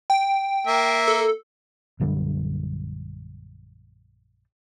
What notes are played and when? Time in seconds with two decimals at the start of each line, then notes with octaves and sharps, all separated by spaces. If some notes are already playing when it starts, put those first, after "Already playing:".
0.10 G5
0.67 A#3 E5
1.08 A4
2.00 A#1 F#2 D3 G3